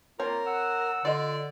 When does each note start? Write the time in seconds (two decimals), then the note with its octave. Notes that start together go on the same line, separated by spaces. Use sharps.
0.19 A#3 C4 F4 A#4 C#5 A#5
0.46 F#5 E6
1.05 D3 F4 D5 D#5